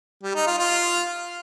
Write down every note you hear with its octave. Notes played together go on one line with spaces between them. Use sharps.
G3
D#4
F4
F4